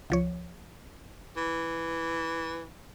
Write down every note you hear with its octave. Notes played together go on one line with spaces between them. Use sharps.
C#2 F3 C#5
E3